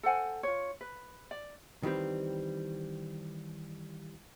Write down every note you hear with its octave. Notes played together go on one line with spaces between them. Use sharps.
A4 C5 F#5 G#5
F4 C#5
B4
D5
D#3 E3 G3 C4